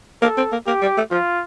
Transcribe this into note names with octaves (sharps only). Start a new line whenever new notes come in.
A#3 A4
C4
A#3
A#3 G4
G3
A3
F3 F4